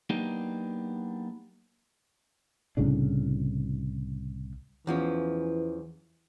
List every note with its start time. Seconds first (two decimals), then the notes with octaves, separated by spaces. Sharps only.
0.10 F#3 A#3 B3 D4 D#4 G4
2.77 C2 A2 C#3 D4
4.87 E2 E3 F3 C#4